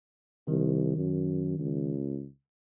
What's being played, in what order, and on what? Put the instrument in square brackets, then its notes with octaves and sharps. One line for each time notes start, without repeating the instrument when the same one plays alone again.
[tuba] C2 [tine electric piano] D#3
[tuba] F#2
C#2